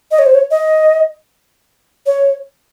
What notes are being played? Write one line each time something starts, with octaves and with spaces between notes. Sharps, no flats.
D#5
C#5
C5
C#5
D#5
C#5